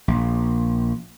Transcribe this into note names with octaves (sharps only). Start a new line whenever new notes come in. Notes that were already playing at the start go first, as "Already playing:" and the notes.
A#1